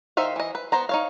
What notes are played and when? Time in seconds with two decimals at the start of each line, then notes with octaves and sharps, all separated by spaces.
0.17 D#3 D#4 C5 E5 F5
0.36 E3 D#5
0.55 B4
0.72 B3 C5 A#5
0.89 D#4 C#5 F5